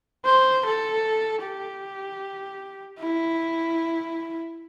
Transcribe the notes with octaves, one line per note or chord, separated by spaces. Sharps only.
C5
A4
G4
E4